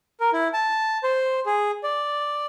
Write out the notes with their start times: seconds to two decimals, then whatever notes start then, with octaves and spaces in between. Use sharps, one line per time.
0.20 A#4
0.33 E4
0.54 A5
1.03 C5
1.46 G#4
1.83 D5